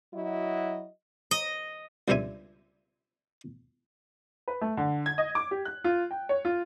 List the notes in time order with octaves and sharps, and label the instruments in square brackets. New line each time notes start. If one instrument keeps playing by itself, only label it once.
[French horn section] F#3 E4 F#4 D#5
[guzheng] D#5
[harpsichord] C#2 D3 G3 C4 E5 G#5
[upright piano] B4
A3
D3
G#6
D#5
D6
G4
F#6
F4
G5
C#5
F4